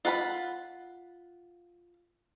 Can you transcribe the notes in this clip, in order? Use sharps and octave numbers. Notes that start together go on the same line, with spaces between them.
F4 F#5 A#5 B5